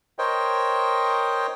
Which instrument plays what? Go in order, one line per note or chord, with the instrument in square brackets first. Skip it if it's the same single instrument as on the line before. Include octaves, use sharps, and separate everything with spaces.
[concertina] A#4 C5 C#5 D#5 G5